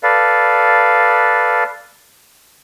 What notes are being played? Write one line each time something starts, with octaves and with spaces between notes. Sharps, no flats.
A4 B4 D5 F5